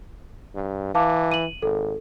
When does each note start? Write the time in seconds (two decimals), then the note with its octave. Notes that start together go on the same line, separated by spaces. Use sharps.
0.55 G2
0.95 E3 F5 A5 D6
1.32 D#7 F#7
1.62 G#1 A4